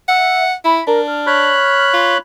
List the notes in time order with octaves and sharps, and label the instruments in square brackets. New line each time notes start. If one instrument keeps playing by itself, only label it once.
[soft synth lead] E5 [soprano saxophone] F#5
[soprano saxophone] E4 [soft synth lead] B5
[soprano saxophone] D4 [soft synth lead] A#4
[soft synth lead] F6
[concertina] C#5 B5 F#6
[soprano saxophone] F4